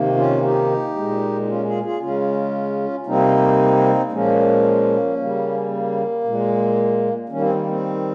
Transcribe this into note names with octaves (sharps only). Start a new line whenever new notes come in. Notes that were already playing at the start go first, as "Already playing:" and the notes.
Already playing: C3 D#3 A#3
C#4 F4
D#4 G4
A#2 G#3
D#4
C#4 F4
F4 G#4
F4 G#4
C#3 G#3 C#4 F4
C3 G3 A#3 C4 D#4
A#2 F3 G#3 A#3 C#4
C#3 G3 A#3
A#3
A#2 G#3
D#3 G3 A#3 C#4
C4
A#3
C4